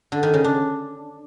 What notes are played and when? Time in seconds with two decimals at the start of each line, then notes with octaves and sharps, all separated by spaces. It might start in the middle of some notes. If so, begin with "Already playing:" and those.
0.12 D3
0.23 D#3
0.34 C#3
0.44 D4